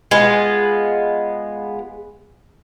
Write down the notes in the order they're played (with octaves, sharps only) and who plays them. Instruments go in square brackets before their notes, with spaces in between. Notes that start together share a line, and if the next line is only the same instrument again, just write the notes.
[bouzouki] G#3 B3 F4